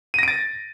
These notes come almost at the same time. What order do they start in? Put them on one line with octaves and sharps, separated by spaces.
D#7 A#6 D7 A6